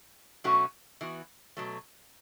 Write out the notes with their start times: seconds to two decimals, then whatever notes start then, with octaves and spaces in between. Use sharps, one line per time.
0.44 B2 F#3 A3 C#4 F#4
1.01 E3 B3 F#4
1.57 B2 F#3 A3